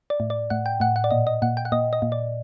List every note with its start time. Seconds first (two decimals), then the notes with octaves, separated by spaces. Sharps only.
0.10 D5
0.20 A2
0.30 D5
0.50 A2 F#5
0.66 G5
0.80 A2 F#5
0.96 F#5
1.04 D5
1.11 A#2 D#5
1.27 D#5
1.42 A#2 F#5
1.57 G5
1.65 F#5
1.72 A#2 D#5
1.93 D#5
2.02 A#2
2.12 D5